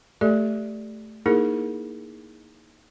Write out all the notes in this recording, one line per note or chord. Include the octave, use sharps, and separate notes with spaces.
A3 G4 A4 D5
A#3 D#4 E4 G#4 A#4